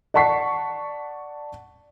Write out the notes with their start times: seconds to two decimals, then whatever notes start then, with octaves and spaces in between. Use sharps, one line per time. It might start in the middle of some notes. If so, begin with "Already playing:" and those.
0.14 D5 F#5 A5 C#6 B6 C7